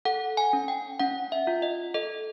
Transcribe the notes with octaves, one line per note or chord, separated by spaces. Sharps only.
A4 F#5
G#5
C#4
G5
C#4 F#5
E5
F4
D#5
A4 D#5